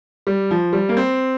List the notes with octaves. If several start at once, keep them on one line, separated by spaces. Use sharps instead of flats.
G3
F3
G3
A#3
C4